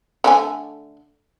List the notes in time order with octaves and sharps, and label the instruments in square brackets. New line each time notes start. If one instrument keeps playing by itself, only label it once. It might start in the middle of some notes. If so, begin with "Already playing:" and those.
[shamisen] D3 A3 G#5